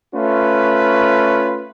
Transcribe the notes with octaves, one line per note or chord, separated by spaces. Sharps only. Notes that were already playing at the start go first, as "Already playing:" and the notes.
A3 C#4 F4 B4